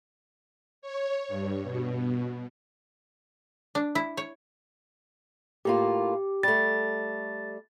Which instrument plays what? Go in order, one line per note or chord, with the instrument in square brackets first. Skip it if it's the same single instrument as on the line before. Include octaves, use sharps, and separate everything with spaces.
[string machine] C#5
G2
B2
[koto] D4
E4
C#5
[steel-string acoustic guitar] A2 A#3 F4 [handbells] G4
[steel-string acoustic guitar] G3 A3 [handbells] A6